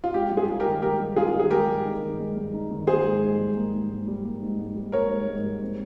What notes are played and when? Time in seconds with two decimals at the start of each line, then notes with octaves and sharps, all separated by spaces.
0.04 F4
0.14 G#3 G4
0.31 G2
0.37 F4 G#4
0.48 D#4
0.60 G4 A#4
0.65 D#3
0.82 G#3 G4 A#4
1.00 G2
1.16 D#4 F4 G#4
1.34 D#3
1.40 G#4
1.50 G#3 G4 A#4
1.68 G2
1.85 D#4
2.02 D#3
2.19 G#3
2.36 G2
2.54 D#4
2.71 D#3
2.87 A#3 G#4 C5
3.05 G#2
3.22 G#2
3.39 G3
3.56 A#3
3.73 G#2
3.91 G#2
4.07 G3
4.24 A#3
4.42 G#2
4.59 G#2
4.76 G3
4.92 A#3 A#4 C#5
5.10 G#2
5.28 G#2
5.44 G3
5.62 C4